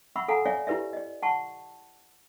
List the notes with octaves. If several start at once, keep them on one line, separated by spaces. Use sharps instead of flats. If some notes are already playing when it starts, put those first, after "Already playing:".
E5 F#5 B5 C#6 E6
A4 F5 F#5 G#5 A#5
C#5 D5 E5 F5 G#5
E4 G4 B4 D5 E5
D5 D#5
F#5 A5 C#6